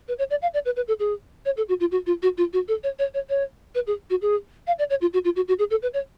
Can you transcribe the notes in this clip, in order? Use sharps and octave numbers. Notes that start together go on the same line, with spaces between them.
B4
C#5
D5
F5
D5
B4
B4
A4
G#4
C#5
A4
F#4
F4
F#4
F4
F#4
F4
F#4
A4
C#5
C#5
C#5
C#5
B4
G#4
F#4
G#4
F5
D5
C#5
F4
F#4
F4
F#4
F#4
G#4
A4
B4
C#5